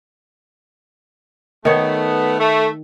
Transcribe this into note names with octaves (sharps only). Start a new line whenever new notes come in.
D#3 A3 B3 C#5
A3